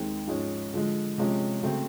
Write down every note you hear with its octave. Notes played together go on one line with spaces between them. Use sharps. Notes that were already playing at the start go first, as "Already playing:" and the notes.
Already playing: D#2 D#3 G#3 C4
G#2 F3 G#3 C#4
D3 F3 G#3
C3 F3 G#3 C#4
C#3 F#3 A3 C4